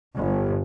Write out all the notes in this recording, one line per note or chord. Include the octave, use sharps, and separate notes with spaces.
G1